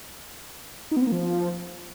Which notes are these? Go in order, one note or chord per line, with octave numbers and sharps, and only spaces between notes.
D#4
B3
C4
A#3
F3